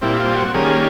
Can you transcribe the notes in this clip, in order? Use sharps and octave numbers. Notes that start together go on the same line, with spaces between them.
A#2 G3 C4 E4
F4
F#4
D#3 G3 A#3 C#4 G#4